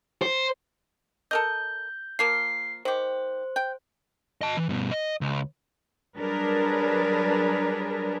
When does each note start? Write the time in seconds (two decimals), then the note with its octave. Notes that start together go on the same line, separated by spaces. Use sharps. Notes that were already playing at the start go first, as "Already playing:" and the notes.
0.22 C5
1.31 A4 A#4 D#5 G6
2.19 F3 A#3 F4 C7
2.85 D#3 G4 C5
3.56 G5
4.41 D#5 A5
4.57 E3
4.69 G2 B2
4.91 D#5
5.21 C#2
6.17 F#3 G3 D4 G#4 A#4 B4